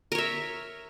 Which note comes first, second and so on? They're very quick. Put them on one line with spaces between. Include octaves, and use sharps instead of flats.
A#4 C#5 E5